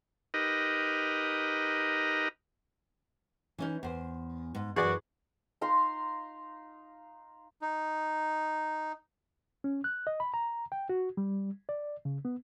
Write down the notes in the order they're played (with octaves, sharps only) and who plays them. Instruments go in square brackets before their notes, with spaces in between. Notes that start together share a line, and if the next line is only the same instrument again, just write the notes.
[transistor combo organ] D#4 G4 A#4 B4 D#5
[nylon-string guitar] E3 C#4 D#4
E2 C5
G#2
[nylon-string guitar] F#2 E3 [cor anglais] F#4 [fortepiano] G#4 D5
[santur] D#4 F5 A#5 C6
[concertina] D#4
[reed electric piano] C#4
F#6
D#5
B5
A#5
G5
F#4
G3
D5
C#3
B3